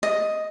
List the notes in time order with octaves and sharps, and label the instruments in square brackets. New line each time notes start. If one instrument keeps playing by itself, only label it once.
[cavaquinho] D#5